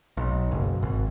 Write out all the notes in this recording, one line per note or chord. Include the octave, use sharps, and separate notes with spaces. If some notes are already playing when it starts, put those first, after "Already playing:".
B1
F#1
G#1